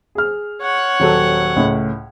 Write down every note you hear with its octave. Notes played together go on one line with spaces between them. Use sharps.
G#4 F6
C#5 F#5
D#1 F#3 A4
C#2 A2